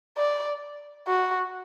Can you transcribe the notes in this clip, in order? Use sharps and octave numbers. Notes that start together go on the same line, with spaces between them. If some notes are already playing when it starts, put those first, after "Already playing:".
D5
F#4